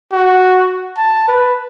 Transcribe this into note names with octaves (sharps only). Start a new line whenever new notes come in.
F#4
A5
B4